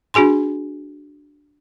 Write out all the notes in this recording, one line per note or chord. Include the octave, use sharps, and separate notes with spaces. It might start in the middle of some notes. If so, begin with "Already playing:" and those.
D4 F#4 G#4 G#5 C6